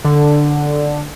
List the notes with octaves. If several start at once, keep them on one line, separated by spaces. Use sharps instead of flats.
D3